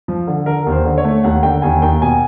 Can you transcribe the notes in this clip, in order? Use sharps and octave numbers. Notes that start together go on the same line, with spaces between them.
F3
D3
D3 A#4
D#2
C5
D3
C#5
A3
D#2 F#5
D3 G5
D#2 G#5
D#2 G5
B2 G#5